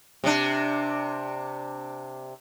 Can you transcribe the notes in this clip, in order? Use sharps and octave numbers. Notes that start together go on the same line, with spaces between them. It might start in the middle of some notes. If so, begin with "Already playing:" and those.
C3 D4